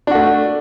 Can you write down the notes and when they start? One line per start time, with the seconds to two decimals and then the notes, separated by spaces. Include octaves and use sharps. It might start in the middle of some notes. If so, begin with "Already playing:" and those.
0.07 D4
0.11 F#4
0.15 A3